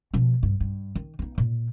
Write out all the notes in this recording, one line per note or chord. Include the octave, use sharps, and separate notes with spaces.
B2 F3
G2
G2
D#3
B3 D#4
A#2